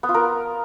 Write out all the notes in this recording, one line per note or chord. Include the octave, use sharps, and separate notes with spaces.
B3
F4
A#4